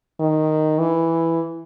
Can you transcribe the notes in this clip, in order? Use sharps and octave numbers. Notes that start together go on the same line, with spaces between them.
D#3
E3